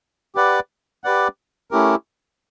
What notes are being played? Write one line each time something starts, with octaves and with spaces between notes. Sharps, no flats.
G4 B4 D5 F#5
G4 B4 D5 F#5
A3 C#4 E4 G4 A#4